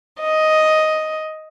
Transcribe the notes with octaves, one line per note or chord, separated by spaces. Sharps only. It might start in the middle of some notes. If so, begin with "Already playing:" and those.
D#5